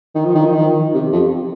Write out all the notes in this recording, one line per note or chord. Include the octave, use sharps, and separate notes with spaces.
D#3
F3
D#3
F3
D#3
C3
F2